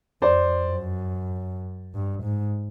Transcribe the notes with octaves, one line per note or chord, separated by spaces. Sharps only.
F2 C5 D5
F#2
G2
G#2